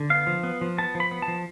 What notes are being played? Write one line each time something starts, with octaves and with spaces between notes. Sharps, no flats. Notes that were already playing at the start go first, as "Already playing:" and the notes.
Already playing: D3
B3 F5
F3
B3
F3
B3 A5
F3
B5
B3
A5
F3